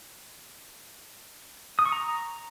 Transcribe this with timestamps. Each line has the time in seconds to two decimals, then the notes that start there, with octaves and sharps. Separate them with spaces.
1.79 D#6
1.86 C#6
1.92 A#5